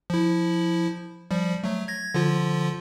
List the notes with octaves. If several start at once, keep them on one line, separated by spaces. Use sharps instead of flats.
F3 E4
F3 G3
F#3 A3
G#6 A#6
D3 F3 F4